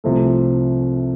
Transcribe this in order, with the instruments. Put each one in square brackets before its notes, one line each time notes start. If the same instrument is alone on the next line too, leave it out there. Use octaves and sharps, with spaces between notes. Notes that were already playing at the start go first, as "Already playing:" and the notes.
[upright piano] C2 C3 F3 A3